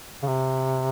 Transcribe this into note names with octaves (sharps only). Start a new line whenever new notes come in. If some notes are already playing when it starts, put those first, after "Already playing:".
C#3
C3